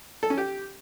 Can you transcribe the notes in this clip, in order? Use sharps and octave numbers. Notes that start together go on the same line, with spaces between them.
A4
C#4
G4